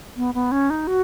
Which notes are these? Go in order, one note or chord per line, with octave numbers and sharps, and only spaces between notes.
B3
B3
C#4
D#4
F#4